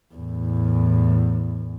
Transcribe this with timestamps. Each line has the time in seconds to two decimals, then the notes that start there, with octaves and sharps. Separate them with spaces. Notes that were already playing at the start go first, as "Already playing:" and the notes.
0.15 E2 A2